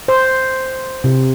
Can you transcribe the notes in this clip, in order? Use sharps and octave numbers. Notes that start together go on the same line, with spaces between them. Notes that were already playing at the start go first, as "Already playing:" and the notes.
C5
C3